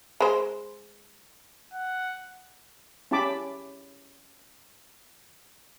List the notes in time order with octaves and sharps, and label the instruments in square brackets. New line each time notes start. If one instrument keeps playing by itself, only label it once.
[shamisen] G#3 C5
[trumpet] F#5
[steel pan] C#4 E4 G4 A5 B5 D6